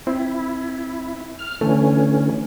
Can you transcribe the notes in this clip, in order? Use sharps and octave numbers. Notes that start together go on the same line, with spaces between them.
C4 E4
F6
D3 E3 A3 C#4